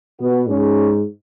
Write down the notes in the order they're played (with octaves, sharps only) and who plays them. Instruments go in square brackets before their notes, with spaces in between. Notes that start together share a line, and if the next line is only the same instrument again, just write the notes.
[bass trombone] B2 [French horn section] B3
[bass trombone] G#2 [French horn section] C#4